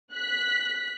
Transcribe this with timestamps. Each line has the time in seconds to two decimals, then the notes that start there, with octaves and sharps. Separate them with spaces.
0.14 F#6 B6